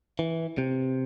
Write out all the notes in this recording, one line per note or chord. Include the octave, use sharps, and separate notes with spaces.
E3
C3